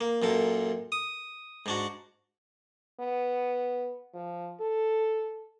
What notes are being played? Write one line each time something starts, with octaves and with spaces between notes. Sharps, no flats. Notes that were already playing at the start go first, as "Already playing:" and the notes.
A#3
F#2 A#2 A4
D#6
G#2 D4 F#4
B3
F3
A4